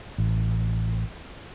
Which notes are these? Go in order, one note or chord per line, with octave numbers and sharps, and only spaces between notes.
A1